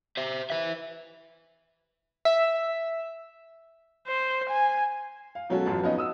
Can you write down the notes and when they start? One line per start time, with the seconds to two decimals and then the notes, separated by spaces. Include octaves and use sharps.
0.17 C5 E5
0.50 B4 E5
2.25 E5
4.07 C5
4.50 G#5
5.35 F5
5.49 B2 F#3 G#3 C#4 F#4 A4
5.65 A1 F#2 F4 B4 A5
5.83 F2 B3 C#4 D#4 D#5 F5
5.97 F#4 D#6 E6